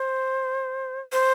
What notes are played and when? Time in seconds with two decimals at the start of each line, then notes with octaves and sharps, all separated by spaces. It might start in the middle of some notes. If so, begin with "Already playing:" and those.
Already playing: C5
1.13 C5